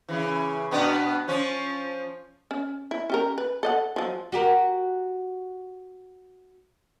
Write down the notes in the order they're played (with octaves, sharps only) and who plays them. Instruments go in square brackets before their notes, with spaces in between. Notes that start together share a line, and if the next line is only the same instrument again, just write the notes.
[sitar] C#3 E3
B2 B3 D4
F3 C#4
[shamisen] C#4
E4
C#4 G4 A#4
B4
A4 D#5 F#5
F3 F#3
[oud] F#4 G4 A#4